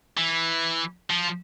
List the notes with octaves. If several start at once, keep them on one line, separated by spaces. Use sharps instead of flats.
E3
F3